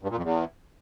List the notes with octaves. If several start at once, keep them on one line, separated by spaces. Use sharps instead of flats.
G2
A#2
F2
E2